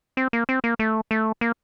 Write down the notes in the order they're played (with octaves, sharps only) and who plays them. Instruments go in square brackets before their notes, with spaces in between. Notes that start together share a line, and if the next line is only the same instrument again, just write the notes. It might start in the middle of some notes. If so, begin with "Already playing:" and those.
[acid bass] C4
A#3
C4
A#3
A3
A3
A#3